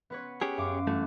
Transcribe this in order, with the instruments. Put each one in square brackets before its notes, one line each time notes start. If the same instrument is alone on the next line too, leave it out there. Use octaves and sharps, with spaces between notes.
[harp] B3 B4 C#5
[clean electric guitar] C#4 G4 G#4
[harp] F#2 F5 D6
[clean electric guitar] G2 E3 A3 [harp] F#4